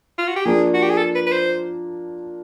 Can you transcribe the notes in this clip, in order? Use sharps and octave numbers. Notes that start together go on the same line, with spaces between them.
F4
F#4
G4
F3 A#3 D4 G#4
F#4
G4
G#4
A4
B4
B4
C5